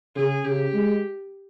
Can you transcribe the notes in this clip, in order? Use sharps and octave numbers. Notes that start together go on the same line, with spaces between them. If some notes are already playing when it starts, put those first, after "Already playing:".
C#3 G#4
C#3 G4
G#3